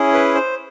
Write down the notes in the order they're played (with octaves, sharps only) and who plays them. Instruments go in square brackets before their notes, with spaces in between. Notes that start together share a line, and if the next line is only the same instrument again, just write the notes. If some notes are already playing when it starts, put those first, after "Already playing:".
Already playing: [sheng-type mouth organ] C#4 E4 G#4
B4
C5